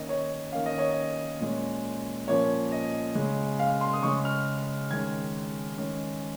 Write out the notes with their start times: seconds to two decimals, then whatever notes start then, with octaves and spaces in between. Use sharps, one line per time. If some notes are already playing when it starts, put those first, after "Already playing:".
Already playing: D#3 A#3 C#4 D#5
0.09 C#5
0.52 D#3 A#3 C#4 F5
0.66 D#5
0.78 C#5
0.91 D#5
1.40 A#2 G#3 C#4
2.28 A#2 F3 A#3 C#4 C#5
2.72 D#5
3.15 C#3 G#3 C#4
3.59 F5
3.81 C6
3.93 D#6
4.02 C#3 G#3 C#4 C#6
4.25 F6
4.91 D#3 G#3 C#4 G#6
5.78 D#3 G#3 C#4